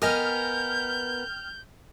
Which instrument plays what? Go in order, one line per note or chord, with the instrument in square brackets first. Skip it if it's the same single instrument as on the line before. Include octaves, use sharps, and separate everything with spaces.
[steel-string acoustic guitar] B3 A#4 [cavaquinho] D#5 G#5 D#6 [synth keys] G5 F6 [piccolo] G6